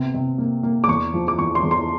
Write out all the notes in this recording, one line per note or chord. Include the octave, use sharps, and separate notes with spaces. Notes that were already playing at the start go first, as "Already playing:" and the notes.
Already playing: C3 B3
C3
A#3
A#3
D6
E2 C#6
F3
D6
E2 C#6
C6
E2
C6